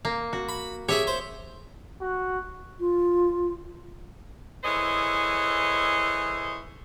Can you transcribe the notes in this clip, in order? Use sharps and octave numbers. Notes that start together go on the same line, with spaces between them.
A#3
F#4
B5
G4 G#4 C#5 E5
C5
F#4
F4
E3 G#4 A4 C5 C#5 D#5